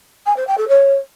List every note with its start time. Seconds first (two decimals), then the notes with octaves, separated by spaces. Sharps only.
0.26 G#5
0.36 C5
0.47 G5
0.58 A4
0.68 C#5